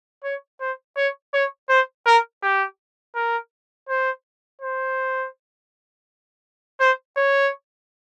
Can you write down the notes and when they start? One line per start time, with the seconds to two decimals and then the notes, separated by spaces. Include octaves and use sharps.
0.24 C#5
0.60 C5
0.97 C#5
1.33 C#5
1.69 C5
2.06 A#4
2.43 G4
3.15 A#4
3.89 C5
4.61 C5
6.80 C5
7.17 C#5